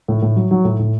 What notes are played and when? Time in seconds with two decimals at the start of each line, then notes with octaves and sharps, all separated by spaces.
0.08 A2
0.22 A2
0.36 F#3
0.51 F#3
0.65 A2
0.79 A2